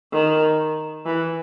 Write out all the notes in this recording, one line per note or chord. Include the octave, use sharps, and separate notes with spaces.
D#3
E3